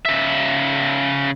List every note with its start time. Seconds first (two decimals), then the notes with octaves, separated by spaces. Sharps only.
0.05 C#3 E5